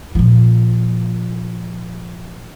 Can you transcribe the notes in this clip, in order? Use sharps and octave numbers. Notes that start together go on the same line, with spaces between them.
A#2 F3